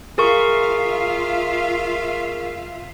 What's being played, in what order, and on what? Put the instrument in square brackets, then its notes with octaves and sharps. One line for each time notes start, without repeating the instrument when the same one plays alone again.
[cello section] F4 E5 F5 [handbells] G#4 A#4 C#6